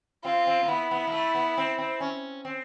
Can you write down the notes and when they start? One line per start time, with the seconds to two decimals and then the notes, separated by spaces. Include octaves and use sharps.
0.24 C4 F4
0.47 C4
0.63 A#3
0.68 B3 E4
0.91 B3
1.07 A#3
1.12 A3
1.35 B3
1.57 C4
1.78 C4
2.00 C#4
2.45 C4